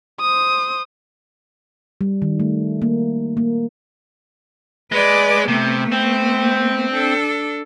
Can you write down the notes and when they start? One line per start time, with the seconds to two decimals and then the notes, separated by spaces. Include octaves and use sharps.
0.20 C5 D#6
2.01 G3
2.22 D#3
2.40 A3
2.82 A#3
3.37 A#3
4.92 G#3 B4 D5
5.48 C3 A3 B3
5.92 C4
6.93 D4 A4